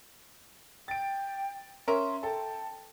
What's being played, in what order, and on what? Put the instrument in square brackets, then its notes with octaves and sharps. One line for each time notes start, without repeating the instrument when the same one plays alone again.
[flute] G5 [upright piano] A6 D7
[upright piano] C#4 [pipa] A#4 E5 [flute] C6
[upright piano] A4 A5 [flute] G5